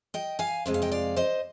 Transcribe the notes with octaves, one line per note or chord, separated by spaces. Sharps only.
D#5 G5
F5 G#5
F2 C3 G#3
F5
D#5 G5
D5 F5
C5 D#5